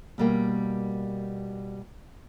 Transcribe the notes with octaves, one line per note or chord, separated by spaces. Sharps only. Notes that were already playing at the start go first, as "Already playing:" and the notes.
B2 G3 A#3